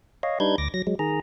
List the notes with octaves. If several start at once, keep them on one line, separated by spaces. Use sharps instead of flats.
C#5 D#5 F5
G3 D4 D#4 B4 G6 G#6
D2 D6 A#6
F#3 A#6
F#3 G#3
D#3 G#4 A#5